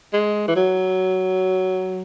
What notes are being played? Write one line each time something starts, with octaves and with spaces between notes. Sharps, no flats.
G#3
E3
F#3